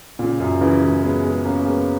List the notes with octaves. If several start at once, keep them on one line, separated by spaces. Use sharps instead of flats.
A#2 C#3
F#2 A#2
C#3 E3
E3 G#3
G#3 B3
G#3 B3
A#3 C#4
A#3
G#3 B3